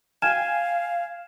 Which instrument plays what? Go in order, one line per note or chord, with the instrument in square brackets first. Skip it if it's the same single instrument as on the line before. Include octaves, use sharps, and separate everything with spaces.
[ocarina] F5 [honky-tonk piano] G5 G#5 [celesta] F6 G#6 E7